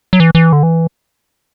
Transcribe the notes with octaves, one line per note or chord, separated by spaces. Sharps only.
F#3
E3
E3
D3
E3